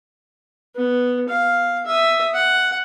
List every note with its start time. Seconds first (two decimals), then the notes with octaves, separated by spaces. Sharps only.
0.76 B3
1.29 F5
1.86 E5 D#6
2.34 F#5